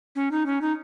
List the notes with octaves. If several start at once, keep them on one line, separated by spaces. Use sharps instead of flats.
C#4
D#4
C#4
D#4